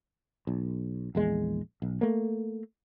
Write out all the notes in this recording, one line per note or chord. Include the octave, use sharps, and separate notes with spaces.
B1
A#1 E2 G#3
B1
A3 A#3